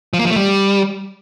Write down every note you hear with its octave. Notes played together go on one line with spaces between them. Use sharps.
F3
A#3
F3
A3
G3